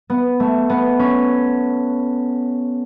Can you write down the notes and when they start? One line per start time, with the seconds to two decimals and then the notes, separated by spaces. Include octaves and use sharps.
0.10 B3
0.40 A3
0.70 B3
0.99 C#4